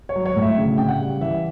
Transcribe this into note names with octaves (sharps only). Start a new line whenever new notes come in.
C#5
F#3
C#5
A2
E5
C#3
C#3 G5
F#5
G3
E3 E5